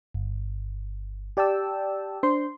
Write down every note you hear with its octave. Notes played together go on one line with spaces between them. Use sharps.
G1
G4 D5 G5 A5 E6
D4 C5 C6